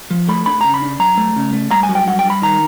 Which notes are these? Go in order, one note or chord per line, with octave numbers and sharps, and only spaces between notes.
F3
A3 B5
D4 B5
C#3 A#5
B5
D4
F#3 A#5
A3
C#3
A3
G2 A#5
G#5
F#3
G5
G2 F#5
G5
G2 B5
D#3 A#5